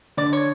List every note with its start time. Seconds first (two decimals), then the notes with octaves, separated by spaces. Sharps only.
0.17 D3 D5
0.33 C#5